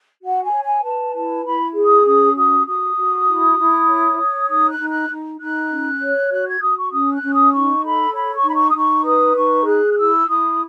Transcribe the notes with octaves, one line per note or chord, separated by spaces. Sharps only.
F#4 F#5
G#5
C#5
G#5
B4 A5
E4 A5
E4 B5
G#4
D#6
C#4 D#6
F#4 D#6
F#4 D#6
F#4
E4
E4
C#5
C#5
D#4 D#6
F#6
D#4
F#6
D#4
D#4 F#6
C#4
C#5
F#4 F#6
G#6
F#4 D#6
C#6
C#4 D#6
F#6
C#4
D#6
D#4 C#6
A4 B5
C#5 B5
C#6
D#4 B5
C#6
D#6
D#4 C#6
B4 D#6
D#4 C#6
G#4 F#6
F#6
E4 E6
E4 D#6